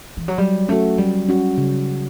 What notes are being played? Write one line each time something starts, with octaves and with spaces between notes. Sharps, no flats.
E3
F#3
F#3 G3
A3 C#4 F#4
F#3 G3
C#4 F#4
C#3